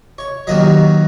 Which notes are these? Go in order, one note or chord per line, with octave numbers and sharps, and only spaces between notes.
C#5
D#2 D#3 F#3 D#5